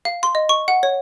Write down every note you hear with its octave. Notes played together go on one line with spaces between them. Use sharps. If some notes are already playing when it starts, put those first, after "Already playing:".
F5
C6
D#5
C#6
F#5
C#5